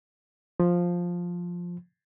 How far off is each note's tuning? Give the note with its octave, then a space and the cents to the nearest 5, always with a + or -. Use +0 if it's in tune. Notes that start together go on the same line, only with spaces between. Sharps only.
F3 +5